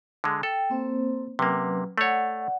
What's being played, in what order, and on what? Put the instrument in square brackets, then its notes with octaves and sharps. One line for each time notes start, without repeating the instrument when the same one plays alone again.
[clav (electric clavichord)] D3 G#3
[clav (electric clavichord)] A4 [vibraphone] G5
[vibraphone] A#3 C4 C5
[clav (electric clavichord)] C3 A#3 [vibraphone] F#3 C#4 B4
[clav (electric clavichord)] A3 C#5 [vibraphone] D5 F#5